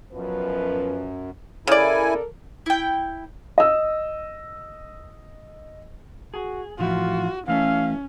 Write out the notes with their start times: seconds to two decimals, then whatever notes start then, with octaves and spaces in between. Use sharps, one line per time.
0.12 F#2 B2 F3 B4
1.67 C#3 E4 A4 A#4 D5 G#5
2.66 E4 G5
3.58 D#5 E6
6.34 F#4 G#4
6.79 A2 E3 F3 F4 F#4
7.48 E3 A3 C#4 F5